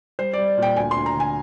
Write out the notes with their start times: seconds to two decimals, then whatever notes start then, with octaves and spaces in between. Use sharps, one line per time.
0.19 G3 C5
0.33 G3 D5
0.58 A#2 G5
0.76 D2 G#5
0.91 C6
0.96 D2
1.06 A#5
1.16 D3 G#5